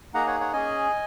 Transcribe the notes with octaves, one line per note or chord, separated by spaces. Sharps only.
A#3 D#4 G#4 F#5 A#5
C#5 F#5
C#5 F#5
C#4 G#4 D#5 G#5